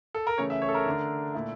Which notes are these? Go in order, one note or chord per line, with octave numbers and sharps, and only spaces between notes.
A4
A#4
C#3 E3 A3 C#4 C#5
E5
C#5
A4
A#4
D3 A3 D4
A#2 A3 E4